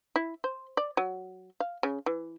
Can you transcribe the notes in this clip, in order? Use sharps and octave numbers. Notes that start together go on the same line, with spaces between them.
E4
C5
D5
F#3
F5
C#3
E3